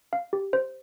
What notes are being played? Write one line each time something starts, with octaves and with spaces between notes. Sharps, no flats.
F5
G4
C5